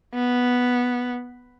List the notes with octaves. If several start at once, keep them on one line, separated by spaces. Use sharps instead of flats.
B3